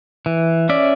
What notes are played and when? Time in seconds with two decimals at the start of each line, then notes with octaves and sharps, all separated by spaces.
0.26 E3
0.69 C#4 D5 E5